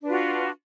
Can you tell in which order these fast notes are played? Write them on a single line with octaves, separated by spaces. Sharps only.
D4 B4 F4 F#4